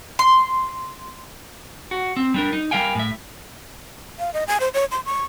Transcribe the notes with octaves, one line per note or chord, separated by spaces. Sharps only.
C6
F#4
C4
G3 D4 A#4
D#4
G3 A#3 A#4 F5 G5 G#5
A2 E5
F5
D#5
G#5
C5
C#5
C6
C#6